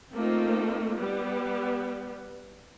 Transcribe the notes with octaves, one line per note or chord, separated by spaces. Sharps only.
A3 A#3 C4 D#4 F4
G3 B3